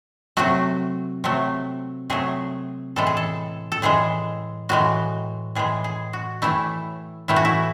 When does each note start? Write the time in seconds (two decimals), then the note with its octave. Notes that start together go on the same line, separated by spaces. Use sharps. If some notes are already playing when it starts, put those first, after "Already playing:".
0.37 C3 F#3 A3 F#4
1.24 C3 F#3 A3
2.10 C3 F#3 A3 G#4
2.96 A2 E3 G#3 A4
3.07 G#4
3.17 A4
3.72 A4
3.82 A2 E3 G#3 G#4
4.69 A2 E3 G#3 F#4
5.55 A2 E3 G#3 G#4
5.84 G#4
6.13 F#4
6.42 A2 E3 A3 E4
7.28 A2 E3 A3 E4
7.36 F#4
7.45 E4